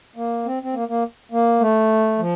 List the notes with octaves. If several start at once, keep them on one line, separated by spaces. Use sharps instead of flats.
A#3
C4
C4
A#3
A#3
A#3
A3
F3